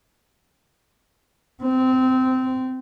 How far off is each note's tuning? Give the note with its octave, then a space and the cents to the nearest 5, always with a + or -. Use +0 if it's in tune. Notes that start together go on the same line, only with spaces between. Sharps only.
C4 -20